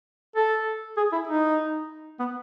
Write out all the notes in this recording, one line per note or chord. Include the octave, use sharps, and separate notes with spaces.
A4
G#4
E4
D#4
B3